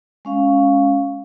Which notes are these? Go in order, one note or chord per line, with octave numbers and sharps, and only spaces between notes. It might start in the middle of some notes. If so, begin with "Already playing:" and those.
G#3 C#4 F5